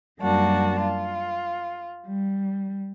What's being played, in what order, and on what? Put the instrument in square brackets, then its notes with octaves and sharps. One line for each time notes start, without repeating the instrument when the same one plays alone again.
[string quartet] F#2 G3 A#3 D4 F#4 A5
F4
G3